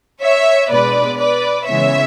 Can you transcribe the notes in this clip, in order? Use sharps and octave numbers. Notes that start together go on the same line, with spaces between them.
C#5 E5
B2 G#3 D4 B4 D5
B4 D5
C#3 E3 G#3 B3 C#5 E5